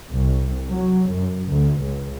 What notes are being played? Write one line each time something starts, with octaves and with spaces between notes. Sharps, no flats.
C2
F#3
F#2
D2
C#2